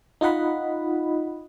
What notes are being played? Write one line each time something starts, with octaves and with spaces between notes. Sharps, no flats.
D#4 F4 D#5 F#5 B5